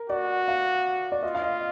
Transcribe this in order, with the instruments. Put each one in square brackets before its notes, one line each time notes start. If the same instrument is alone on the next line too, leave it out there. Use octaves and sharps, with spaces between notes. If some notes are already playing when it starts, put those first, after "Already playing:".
Already playing: [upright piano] A#4
[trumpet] F#4 [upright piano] D5
[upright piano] F5
D5
[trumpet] F4 [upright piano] D#5
[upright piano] F5
D#5